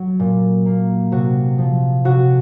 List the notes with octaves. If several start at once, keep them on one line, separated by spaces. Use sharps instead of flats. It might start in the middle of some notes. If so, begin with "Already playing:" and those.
Already playing: F#3
A#2
A#3
C3 F#4
F3
C3 F#4